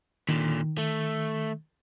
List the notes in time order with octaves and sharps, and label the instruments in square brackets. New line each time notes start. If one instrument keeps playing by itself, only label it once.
[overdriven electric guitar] A#2 D3 [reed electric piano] D#3
[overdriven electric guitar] A3